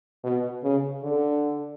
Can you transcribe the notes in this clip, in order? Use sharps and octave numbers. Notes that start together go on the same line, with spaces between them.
B2
C#3
D3